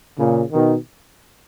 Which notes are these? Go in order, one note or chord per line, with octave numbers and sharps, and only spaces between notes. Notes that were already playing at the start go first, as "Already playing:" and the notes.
A#2 C#3
B2 D#3